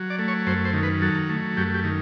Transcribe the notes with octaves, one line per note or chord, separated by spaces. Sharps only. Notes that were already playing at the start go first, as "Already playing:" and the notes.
Already playing: F#3
D5
A3
C#5
F#2 C5
C5
D#3
B4
F#3 A4
A3
F#2 G4
G4
D#3